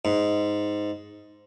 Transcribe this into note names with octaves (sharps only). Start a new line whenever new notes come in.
G#2